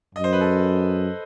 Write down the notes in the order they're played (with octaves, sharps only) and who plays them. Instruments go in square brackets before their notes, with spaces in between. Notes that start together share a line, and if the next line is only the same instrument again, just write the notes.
[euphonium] F#2 [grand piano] D#5
[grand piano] C5
B4
A4